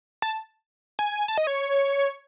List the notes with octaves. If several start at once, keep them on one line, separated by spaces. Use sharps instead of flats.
A5
G#5
A5
D#5
C#5